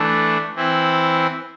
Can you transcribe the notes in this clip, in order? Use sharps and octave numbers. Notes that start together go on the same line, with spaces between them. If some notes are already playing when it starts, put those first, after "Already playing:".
Already playing: E3 A3 D4
E3 C4 E4